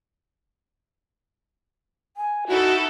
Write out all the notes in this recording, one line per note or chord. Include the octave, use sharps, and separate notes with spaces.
G#5
D#4 E4 F#4 A4